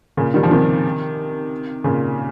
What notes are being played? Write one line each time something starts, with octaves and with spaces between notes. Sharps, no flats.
A#2 C#3
D#3 G3
C#3 F3
C3 D#3
A#2 C#3